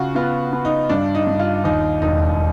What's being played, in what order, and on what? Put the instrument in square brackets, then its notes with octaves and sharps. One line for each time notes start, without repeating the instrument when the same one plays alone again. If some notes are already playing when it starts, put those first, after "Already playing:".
Already playing: [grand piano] C#3 [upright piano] F4 F#4
[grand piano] B3 [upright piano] F4
[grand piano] B3
[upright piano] D#4
[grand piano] G2 [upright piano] D4
[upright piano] D#4
[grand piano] G2
[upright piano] F4
[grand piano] D#2 [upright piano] D#4
[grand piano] E1 [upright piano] D#4